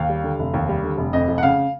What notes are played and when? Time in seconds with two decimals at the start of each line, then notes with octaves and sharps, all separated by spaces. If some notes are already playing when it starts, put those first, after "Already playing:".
Already playing: D#2 F5
0.09 G3
0.24 D3
0.39 F1
0.54 D#2
0.69 G3
0.84 D3
0.98 F1
1.13 F2 D#5
1.28 F1
1.38 F#5
1.43 C#3 F5